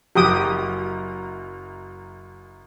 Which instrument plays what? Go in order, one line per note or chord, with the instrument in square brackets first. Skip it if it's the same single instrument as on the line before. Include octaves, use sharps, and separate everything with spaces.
[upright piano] F#1 F#2 [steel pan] G4 G5 D#6